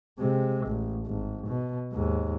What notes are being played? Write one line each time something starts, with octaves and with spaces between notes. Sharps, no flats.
C3 G#3
A1
G#1
B2
D#2 G#2